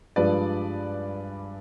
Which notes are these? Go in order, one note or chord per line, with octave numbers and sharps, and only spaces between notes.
G2 F3 G#3 B4 D5